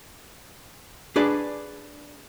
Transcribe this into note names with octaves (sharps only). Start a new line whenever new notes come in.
D4 G#4 B4 D5